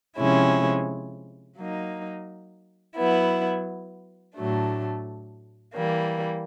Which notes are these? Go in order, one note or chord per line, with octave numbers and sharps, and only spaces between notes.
C3 F3 G#3 C#4 E4
F#3 A#3 D#4
F#3 B3 E4
A2 F#3 A3 D4
E3 G3 A#3